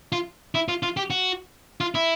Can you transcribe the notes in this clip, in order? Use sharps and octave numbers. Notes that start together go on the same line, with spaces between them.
F4
E4
F4
F4
G4
F#4
F4
E4